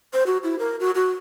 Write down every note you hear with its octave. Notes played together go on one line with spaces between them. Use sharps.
C5
F#4
E4
A#4
F#4
F#4